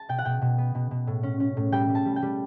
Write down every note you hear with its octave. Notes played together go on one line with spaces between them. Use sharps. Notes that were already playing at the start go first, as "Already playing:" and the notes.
Already playing: A5
B2 G5
F#5
B2 G5
B2
B3
B2
B2
A2
C#4
C#4
A2
G3 G5
G3
A5
G3
G5
G3